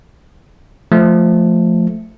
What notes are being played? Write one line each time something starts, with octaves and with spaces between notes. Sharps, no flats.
F3 A3